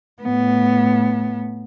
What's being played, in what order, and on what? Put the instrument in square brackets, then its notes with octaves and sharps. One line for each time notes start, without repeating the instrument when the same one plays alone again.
[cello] A2 B3